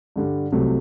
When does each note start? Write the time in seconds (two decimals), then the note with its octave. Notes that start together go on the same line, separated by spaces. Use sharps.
0.16 G2 D3 G3
0.52 C2 C3 F#3 A3